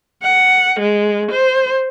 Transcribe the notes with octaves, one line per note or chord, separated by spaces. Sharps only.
F#5
G#3
C5